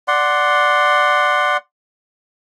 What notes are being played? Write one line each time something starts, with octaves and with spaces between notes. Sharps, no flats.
D5 F#5 C6